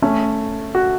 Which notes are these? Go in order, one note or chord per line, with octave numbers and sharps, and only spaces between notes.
A3 C#4
F#4